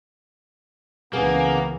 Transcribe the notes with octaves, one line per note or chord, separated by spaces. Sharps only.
C#2 C#3 E3 A#3 B3 G#4